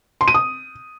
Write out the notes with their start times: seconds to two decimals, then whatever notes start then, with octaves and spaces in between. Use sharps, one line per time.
0.21 C6
0.28 D#7
0.34 D#6